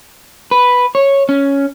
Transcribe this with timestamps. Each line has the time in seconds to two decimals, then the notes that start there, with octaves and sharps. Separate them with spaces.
0.51 B4
0.95 C#5
1.29 C#4